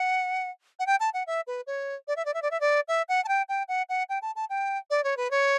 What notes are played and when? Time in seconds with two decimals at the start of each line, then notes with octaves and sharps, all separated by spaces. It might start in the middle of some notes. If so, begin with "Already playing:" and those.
Already playing: F#5
0.79 F#5
0.86 G5
1.00 A5
1.14 F#5
1.27 E5
1.47 B4
1.67 C#5
2.08 D5
2.16 E5
2.25 D5
2.34 E5
2.42 D5
2.51 E5
2.61 D5
2.88 E5
3.09 F#5
3.24 A5
3.28 G5
3.49 G5
3.68 F#5
3.89 F#5
4.09 G5
4.22 A5
4.36 A5
4.49 G5
4.90 D5
5.04 C#5
5.17 B4
5.31 C#5